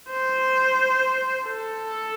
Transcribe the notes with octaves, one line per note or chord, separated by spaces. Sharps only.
C5
A4